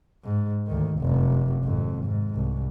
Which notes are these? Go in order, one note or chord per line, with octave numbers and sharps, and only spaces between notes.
G#2
D2 D#3
F1 F#2
G#1 F2
G#2
C2